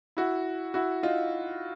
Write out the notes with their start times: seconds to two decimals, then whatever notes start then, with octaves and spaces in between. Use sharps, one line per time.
0.17 E4 F#4
0.74 E4 F#4
1.03 D#4 F4